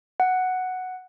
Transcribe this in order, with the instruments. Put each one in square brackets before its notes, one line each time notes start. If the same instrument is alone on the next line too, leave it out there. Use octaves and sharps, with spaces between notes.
[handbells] F#5